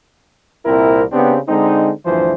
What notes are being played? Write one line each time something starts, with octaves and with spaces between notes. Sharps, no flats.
C2 A#2 C4 E4 A#4
C#3 B3 C4 D4 G4
D3 G#3 C4 D#4
D2 G2 E3 F3 C5